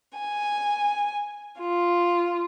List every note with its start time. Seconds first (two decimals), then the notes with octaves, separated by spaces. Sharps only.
0.18 G#5
1.60 F4